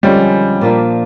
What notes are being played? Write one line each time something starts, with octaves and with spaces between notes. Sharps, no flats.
F2 D3 F3 G3 G#3 C#4
A#2 F3 A#3 D4